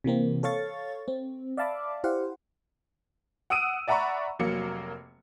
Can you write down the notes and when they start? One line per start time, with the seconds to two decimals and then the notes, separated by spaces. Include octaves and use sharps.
0.04 C3 E3 A#3 C4
0.43 A4 C#5 F5 C#6 A6
1.08 C4
1.57 D5 E5 F5 A5 B5 D6
2.04 E4 G4 C5 F5 F#5
3.50 F#5 D#6 E6 D7 D#7
3.88 D5 E5 F#5 A#5 B5 C#6
4.39 F1 F#3 A#3 C#7